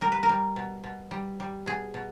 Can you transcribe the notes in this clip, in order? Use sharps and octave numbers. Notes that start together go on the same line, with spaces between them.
G3 A#4
B4
A#4
G3
B2
B2
G3
G3
B2 G#4
B2